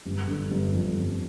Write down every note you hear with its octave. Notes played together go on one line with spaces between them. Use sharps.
G1
D3
G1
F2
G1